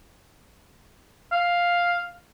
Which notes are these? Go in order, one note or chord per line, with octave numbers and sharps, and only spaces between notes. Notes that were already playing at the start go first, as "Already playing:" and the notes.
F5